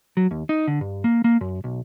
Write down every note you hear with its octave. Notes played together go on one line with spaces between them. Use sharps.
F#3
D#2
D#4
D3
G2
A#3
A#3
F#2
B1